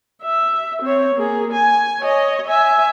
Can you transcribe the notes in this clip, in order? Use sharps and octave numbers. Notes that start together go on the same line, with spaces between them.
E5
C4 C#5
A#3 G#4
G#5
C#5 D#5
E5 G#5